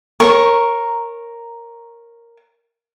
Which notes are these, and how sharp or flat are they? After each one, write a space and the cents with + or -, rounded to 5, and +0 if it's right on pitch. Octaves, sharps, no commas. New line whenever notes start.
A#4 +0 C#5 -20 C#6 +0